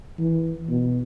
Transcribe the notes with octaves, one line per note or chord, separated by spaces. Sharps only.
E3
B2